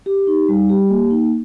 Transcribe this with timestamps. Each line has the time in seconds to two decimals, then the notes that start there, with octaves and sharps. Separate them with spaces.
0.06 G4
0.27 D#4
0.48 G3
0.69 G4
0.90 A#3
1.10 D#4